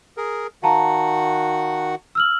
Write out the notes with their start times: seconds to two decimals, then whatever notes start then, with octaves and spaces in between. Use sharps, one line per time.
0.17 G#4 A#4
0.63 D#3 F#4 F5 F#5 A5 A#5
2.15 E6 F6 F#7